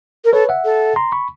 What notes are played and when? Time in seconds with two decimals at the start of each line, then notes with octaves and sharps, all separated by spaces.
0.25 A#4
0.33 A4 B4 C#5
0.49 E5 F#5
0.65 A4
0.96 A#5 C6
1.12 B5 C#6